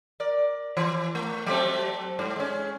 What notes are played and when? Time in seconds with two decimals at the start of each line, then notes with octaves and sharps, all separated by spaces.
0.20 A#4 D5
0.77 E3
1.15 A3
1.47 F#3 A3 C4
2.19 G#2
2.36 G#3 C#4